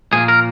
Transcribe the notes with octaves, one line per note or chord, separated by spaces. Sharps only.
A#2 F3 A#3 G#4
A#4